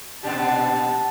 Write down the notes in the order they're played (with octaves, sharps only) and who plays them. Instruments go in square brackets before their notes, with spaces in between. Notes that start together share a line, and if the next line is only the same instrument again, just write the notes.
[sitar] A#2 D4 G4 [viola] A5